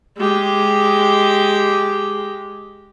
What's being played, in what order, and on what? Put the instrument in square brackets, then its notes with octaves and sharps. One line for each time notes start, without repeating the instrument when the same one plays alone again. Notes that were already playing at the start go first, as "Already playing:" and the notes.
[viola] G#3 G4